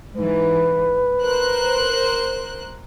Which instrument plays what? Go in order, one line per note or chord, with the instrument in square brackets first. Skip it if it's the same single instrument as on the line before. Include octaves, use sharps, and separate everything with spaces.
[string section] G#2 E3 [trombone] B4
[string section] A#4 C5 F#6